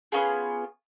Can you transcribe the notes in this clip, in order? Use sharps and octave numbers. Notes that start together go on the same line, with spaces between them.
B3 C#4 F4 G#4